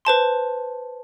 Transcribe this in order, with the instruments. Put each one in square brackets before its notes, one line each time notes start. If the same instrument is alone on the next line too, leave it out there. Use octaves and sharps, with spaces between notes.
[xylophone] B4 C5 A5 C6